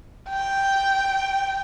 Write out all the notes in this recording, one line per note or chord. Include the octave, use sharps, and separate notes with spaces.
G5